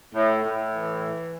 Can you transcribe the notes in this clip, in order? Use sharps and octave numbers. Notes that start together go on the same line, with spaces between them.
A2
A2
E3